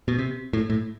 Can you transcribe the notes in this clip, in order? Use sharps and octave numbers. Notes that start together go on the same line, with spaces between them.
B2
C3
A2
A2